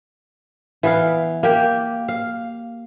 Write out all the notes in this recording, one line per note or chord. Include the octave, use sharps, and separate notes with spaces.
E3 B3 F5
A#3 G4
F5